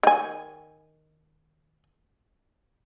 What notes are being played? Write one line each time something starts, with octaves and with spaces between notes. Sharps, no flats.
D#3 G#5